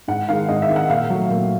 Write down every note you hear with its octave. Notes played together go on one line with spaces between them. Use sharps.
G#2 F#5
D#3 G#3 F5
G#2 D#5
E5
D#3 G#3
F#5
A#2 F5
F#3 A3
A#2